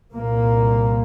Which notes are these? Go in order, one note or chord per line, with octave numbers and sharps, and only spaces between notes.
C2 A#2 A#3